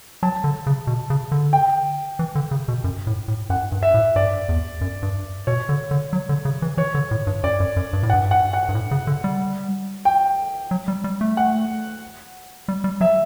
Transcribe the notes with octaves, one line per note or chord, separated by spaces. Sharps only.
F#3 A5
D3
C#3
B2
C#3
D3
G5
E3
D3
C#3
B2
F#2
A2
A2
F#2 F#5
G2
E5
A2
G2 D5
E2
F#2
G2
B2 C#5
D3
D3
F#3
D3
C#3
E3
E3 C#5
D3
A2
G2
F#2 D5
F#2
F#2
G2
A2
F#5
G2
F#5
F#5
G2
A2
C#3
D3
G3
G5
F#3
G3
G3
A3
F#5
G3
G3
F#3 E5